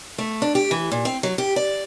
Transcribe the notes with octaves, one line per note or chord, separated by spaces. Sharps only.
A3
D4
G4
E3
A#2
C4
F#3
G4
D5